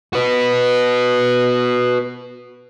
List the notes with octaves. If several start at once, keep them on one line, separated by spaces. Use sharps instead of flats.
F#4 B4